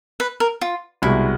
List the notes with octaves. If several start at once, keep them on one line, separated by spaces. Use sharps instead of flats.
B4
A#4
F4
C2 B2 G#3 E4